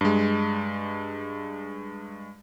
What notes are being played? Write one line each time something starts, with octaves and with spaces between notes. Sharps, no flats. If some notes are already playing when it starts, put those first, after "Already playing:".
G2 G#3